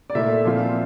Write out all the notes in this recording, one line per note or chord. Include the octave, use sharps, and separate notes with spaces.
D5
A#2 A3 E4 E5
A#2 F3 C4 F4